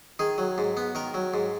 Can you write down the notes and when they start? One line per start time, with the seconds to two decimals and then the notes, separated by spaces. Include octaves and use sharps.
0.19 D#3 G#4
0.38 F#3
0.58 G#2
0.77 B3
0.95 D#3 A#4
1.14 F#3
1.34 G#2